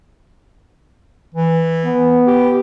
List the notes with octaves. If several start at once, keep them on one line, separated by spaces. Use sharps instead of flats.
E3
B3
G4